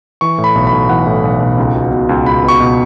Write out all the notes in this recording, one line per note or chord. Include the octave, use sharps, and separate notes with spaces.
E3 C#6
A2
B5
B1
B5
B1
E3 F#5
A2
B1
B1
C#2
B2
B2
C#2
C#2 B5
B2 C#6
B2